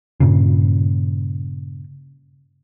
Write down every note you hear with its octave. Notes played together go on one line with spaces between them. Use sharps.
G2 A#2 C#3